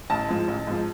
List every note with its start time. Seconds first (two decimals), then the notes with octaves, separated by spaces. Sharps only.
0.10 A1 A5
0.29 G#2 F3
0.48 A1
0.67 G#2 F3